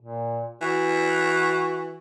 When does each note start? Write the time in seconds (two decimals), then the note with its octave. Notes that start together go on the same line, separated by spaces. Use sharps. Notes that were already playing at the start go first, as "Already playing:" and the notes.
0.01 A#2
0.61 E3 F#4